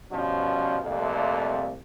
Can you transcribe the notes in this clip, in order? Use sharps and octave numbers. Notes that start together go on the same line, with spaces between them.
G2 B2 F3 C#4
C2 F2 A#2 A3